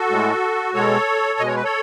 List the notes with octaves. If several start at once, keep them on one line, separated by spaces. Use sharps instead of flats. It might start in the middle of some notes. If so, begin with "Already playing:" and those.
Already playing: F#4 A4
A2 G#3
B2 G#3 A4 C#5
B2 G#3 D#5
C#5
B4
A4 C#5